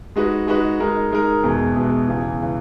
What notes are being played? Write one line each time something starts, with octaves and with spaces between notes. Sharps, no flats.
G#3 D#4 F#4 B4
G#3 D#4 F#4 B4
G#3 D#4 A#4
G#3 D#4 A#4
E2 B2 G#3
E2 B2 G#3
E2 C#3 E3
C#3 E3